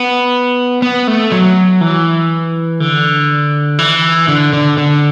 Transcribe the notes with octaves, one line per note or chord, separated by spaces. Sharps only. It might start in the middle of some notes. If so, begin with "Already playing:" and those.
Already playing: B3
B3
A3
F#3
E3
D3
E3
D3
D3
D3